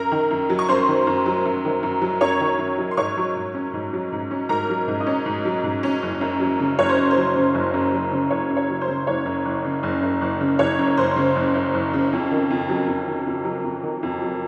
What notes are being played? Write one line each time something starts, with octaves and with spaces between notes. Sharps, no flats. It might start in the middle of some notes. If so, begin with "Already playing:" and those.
Already playing: F#2 A#4 A#5
D#3
F#2
F#3
C#6
F#2 C5 C6
D#3
F#2
F#3
F#2
D#3
F#2
F#3
F#2 C#5 C#6
D#3
F#2
F#3
C6
G#2 C#5 C#6
F#3
G#2
C#4
G#2
F#3
G#2
C#4
G#2 A#4 A#5
F#3
G#2
D#4 D#5
C#4
G#2
F#3
G#2
C#4
F#1
F#2
F#3
C#3
F#1 C#5
C5
F#2
C5
F#3
C#3
F#1
F#2
F#3
C#3
F#1 C#5
F#2
C#5
F#3
C5
C#3
F#1 C#5
F#2
F#1
C#3
F#1
F#2
F#1
C#3
F#1 C#5
F#2
F#1 C5
C#3
F#1
F#2
F#1
C#3
F2
D#3
F2
F#3
F2
D#3
F2
F#3
F2
D#3
F2
F#3